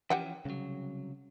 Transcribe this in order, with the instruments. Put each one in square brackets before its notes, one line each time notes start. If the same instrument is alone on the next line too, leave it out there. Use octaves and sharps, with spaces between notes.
[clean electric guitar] E3 F3 C#4 [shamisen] G4 F#5 G5
[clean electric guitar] C2 F#3 [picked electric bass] C#3